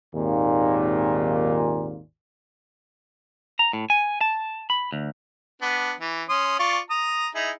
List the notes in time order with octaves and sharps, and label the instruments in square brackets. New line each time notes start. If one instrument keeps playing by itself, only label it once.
[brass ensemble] G#1 D#2 A#2
[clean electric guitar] A#5
A2
G#5
A5
B5
D2
[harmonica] B3 D4
E3
C#4 C6 D#6
F4 D5 C#6
A#5 D#6
D#4 E4 G#4